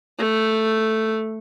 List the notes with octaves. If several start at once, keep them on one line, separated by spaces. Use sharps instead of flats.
A3